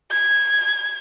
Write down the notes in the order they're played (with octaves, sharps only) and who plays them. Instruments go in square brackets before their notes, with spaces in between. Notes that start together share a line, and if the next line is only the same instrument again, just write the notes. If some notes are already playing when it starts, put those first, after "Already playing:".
[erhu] G#6